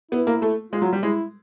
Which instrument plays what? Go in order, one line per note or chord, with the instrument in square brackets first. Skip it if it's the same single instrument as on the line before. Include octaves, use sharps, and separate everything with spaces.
[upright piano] B3 [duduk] E4
[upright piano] A#3
A3
[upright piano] G#3 [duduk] F4
[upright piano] F#3
G3
[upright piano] G#3 [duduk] E4